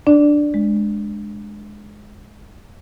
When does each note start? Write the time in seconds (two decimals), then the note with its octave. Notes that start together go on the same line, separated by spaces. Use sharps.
0.07 D4 D5
0.54 G#3